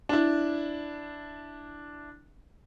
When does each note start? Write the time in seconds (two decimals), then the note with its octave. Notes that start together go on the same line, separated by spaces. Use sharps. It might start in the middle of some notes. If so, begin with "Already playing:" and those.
0.09 D4 E4